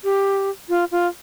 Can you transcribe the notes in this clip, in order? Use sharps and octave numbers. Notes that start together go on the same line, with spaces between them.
G4
F4
F4